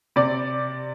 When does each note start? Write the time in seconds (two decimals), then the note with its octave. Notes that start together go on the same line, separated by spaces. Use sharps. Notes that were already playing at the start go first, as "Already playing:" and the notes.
0.16 C3 D5